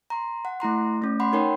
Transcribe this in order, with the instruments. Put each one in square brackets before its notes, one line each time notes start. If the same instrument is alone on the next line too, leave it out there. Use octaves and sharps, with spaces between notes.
[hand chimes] A#5 C6
F#5
A3 E4 A#5 C6
A3 C#4
F#5 B5 C6
D#4 A#4 C#5 G5